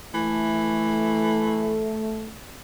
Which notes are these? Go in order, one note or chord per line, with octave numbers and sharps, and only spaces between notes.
E3 A3